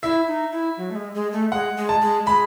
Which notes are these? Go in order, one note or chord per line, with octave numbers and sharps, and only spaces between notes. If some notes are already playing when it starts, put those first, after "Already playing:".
E4 E5
D#4
E4
F#3
A3
G#3
G#3
A3
G#3 F#5
G#3
A5
G#3
G#3 B5